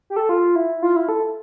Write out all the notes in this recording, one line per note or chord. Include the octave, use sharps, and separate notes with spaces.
G4
A4
F4
E4
F4
E4
A4